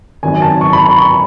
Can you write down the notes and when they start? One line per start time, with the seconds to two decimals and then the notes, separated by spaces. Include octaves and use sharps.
0.23 G#1 F#2 D#3 G#5
0.42 A5
0.61 C#6
0.73 B5
0.85 B5
0.98 C#6